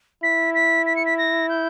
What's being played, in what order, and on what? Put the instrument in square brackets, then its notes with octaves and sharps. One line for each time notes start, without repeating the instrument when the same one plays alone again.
[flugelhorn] E4 [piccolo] B6
[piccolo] B6
B6
C#7
B6
A#6
G6